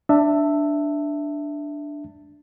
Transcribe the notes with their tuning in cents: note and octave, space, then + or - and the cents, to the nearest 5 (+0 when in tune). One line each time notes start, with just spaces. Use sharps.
D4 +0 E5 +0 A5 +25